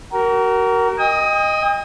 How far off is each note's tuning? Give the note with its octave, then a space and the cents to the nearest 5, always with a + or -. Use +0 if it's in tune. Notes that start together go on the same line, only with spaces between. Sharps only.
F#4 +40 A#4 +0
D#5 +0 G5 +45 D#6 +30